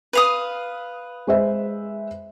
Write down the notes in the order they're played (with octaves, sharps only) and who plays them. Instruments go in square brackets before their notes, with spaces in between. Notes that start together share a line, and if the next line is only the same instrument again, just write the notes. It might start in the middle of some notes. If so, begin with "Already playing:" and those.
[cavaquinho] B4 F5 D#6
[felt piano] G#3 C5 E5